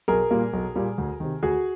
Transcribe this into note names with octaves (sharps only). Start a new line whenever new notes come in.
B1 G#4 A#4
A#2 G3 A#3
B1
A#2 G3 A#3
D2
C3 D#3
D2 F#4 G#4